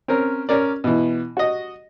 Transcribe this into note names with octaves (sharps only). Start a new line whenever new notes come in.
C4 C#4 A#4
C#4 A#4 D5
B2 E3
F#4 D#5